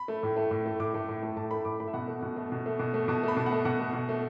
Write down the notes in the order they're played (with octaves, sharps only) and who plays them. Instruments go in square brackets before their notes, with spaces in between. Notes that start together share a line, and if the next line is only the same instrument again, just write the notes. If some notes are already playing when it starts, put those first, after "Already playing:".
Already playing: [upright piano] B5
A3
A2
A3
A2
A3
A2 D6
A3
A2
A3
A2 A5
A3 B5
A2 D6
A3 B5
E5
B2 F#5
A3
B2
A3
B2
A3
B2
A3
B2 A5
A3 B5
B2 A5
A3 F#5
B2 F#5
A3
B2
A3